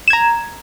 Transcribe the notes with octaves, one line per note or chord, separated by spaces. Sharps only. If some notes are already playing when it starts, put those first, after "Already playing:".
A#5 G#6 E7